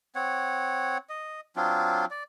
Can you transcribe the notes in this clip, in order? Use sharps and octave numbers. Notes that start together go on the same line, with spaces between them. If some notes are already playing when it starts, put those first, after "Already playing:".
C4 C#5 F#5
D#5
F#3 C4 D4 F4
D5